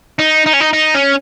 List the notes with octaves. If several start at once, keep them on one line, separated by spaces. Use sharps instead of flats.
D#4
D#4
C#4
D#4
D#4
C#4